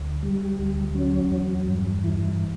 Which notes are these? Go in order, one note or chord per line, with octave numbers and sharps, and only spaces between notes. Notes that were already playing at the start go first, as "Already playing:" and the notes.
Already playing: D2
G3
D2
F#3 C#4
E2
G2
E3